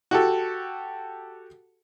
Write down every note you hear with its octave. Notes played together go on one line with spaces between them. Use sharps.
F#4 G4 A4